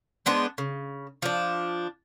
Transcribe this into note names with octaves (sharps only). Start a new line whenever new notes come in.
G#3 B3 D4 C5
C#3
F3 D4